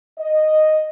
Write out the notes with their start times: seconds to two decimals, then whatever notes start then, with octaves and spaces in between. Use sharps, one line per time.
0.18 D#5